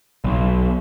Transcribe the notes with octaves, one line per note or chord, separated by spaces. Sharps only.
B1